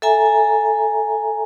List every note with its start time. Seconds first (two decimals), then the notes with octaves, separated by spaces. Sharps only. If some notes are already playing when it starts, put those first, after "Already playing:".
0.02 A4 E5 G#5 A#5